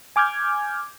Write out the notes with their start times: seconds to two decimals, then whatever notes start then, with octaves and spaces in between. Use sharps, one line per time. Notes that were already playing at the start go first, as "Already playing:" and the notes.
0.16 G#5 D6 F6 G6 G#6